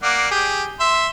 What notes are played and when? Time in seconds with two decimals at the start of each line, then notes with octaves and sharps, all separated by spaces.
0.03 A#3 D5 F#5
0.31 G4 G#4
0.80 E5 C6